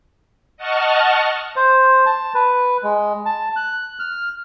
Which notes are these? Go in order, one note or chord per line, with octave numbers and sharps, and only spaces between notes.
D#5 F#5 A5 C#6 F6
C5
A5
B4
G#3
A5
F#6
F6